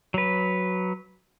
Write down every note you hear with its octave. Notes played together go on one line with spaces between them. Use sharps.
F#3 B4